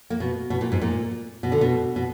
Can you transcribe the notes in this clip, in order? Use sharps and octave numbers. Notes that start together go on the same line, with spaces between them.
A#3
B2
B2
A#2
G#2
A#2
B2
D3
B2
B2